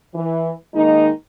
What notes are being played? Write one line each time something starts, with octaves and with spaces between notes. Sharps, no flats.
E3
D#3 G#3 A#3 D#4